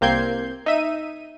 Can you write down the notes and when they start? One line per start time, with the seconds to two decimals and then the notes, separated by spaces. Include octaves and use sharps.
0.01 C2 A#3 C4 G6 G#6 C7
0.66 D#4 E5 D#7